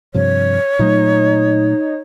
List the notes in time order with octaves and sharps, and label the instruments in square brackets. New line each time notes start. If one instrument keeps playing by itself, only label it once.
[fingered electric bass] G2 C3 F3 [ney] C#5
[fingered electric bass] A#2 F#3 A3 [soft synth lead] D#4